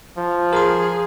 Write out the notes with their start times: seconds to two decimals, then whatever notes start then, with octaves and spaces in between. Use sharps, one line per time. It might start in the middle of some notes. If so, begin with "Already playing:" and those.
0.17 F3
0.53 G#4 A#4 C6